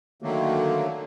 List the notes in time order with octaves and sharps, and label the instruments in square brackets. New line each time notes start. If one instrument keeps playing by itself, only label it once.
[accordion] D3 D#3 F#3 A3 A#3